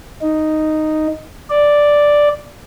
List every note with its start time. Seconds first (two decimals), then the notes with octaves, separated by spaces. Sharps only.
0.21 D#4
1.50 D5